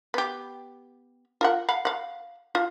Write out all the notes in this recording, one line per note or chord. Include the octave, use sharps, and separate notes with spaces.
B3 G4
F4 A#4 F#5
F5 F#5 B5
F5 F#5
F4